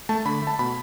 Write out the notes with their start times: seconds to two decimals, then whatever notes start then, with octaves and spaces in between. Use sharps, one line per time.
0.09 A3 A5
0.25 D3 B5
0.42 A3
0.47 A5
0.59 B2 B5